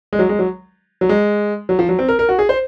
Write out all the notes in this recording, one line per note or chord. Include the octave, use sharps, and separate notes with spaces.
G#3
F#3
G#3
F#3
F#3
G#3
F#3
F3
F#3
C4
A#4
A#4
F#4
G#4
C5